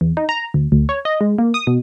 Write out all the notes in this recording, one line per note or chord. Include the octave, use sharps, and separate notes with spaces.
E2
D#4
A#5
D2
D2
C#5
D#5
G#3
A#3
D#6
B2